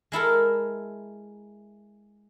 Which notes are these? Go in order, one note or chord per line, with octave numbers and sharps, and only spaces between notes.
G#3 E4 A4 A#4